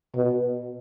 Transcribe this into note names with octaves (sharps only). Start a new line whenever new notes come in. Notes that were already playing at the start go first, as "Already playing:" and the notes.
B2